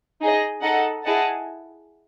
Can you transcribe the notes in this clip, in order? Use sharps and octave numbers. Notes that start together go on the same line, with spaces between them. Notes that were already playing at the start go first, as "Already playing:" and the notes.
D#4 G#4 D#5
D#4 A4 D#5 F#5
E4 G#4 D#5 F#5 A5